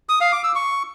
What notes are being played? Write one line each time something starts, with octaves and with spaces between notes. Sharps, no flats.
D#6
F5
D6
E6
C#6